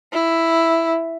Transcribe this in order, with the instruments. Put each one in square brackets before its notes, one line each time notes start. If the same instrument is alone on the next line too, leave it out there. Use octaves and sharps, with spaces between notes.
[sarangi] E4